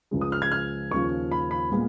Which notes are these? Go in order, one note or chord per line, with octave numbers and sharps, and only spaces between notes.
C#2 C#3 F3 G#3
D#6
F6
G#6
F6
D#2 C#3 F3 C#6
B5
B5
A#2 G#3 B3